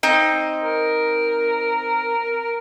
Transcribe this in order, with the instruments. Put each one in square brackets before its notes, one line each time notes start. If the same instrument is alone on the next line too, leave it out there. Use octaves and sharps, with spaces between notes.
[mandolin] C4 D#4 D#5
[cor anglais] A#4